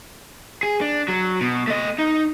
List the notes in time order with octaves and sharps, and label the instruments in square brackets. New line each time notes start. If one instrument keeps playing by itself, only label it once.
[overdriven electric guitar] G#4
D4
F#3
B2
A3 D#5
D#4